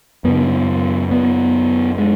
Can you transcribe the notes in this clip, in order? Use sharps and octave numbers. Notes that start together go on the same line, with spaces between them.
F#2 C#3 B3
B3
G#3